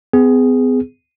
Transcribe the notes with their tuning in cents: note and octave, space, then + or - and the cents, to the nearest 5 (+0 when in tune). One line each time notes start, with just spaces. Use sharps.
B3 +40 G#4 +0